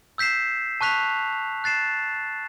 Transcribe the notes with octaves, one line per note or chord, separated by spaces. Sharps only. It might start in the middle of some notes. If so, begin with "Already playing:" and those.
E6 G6 B6 C7 E7
A5 C#6 F#6 B6 F7
F#6 A6 C7 E7